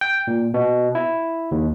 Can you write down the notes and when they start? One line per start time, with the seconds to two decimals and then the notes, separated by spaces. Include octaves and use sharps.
0.01 G5
0.27 A#2
0.54 B2
0.95 E4
1.51 D#2